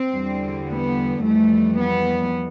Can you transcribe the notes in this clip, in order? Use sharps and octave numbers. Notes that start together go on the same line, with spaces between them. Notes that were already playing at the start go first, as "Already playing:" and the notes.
Already playing: C4
E2 D3 G3
B3
F2 E3 G3 A3
B3